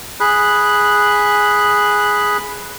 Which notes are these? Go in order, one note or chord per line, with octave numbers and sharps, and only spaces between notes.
G#4 B5 F#6